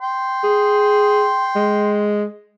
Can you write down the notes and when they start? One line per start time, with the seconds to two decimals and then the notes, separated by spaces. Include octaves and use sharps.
0.01 G5 C6
0.44 G#4
1.55 G#3